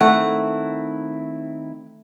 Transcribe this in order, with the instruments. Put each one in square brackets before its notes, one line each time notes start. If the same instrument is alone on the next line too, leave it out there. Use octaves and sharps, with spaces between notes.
[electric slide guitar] D#3 C4 E4 [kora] A3 [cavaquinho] F#5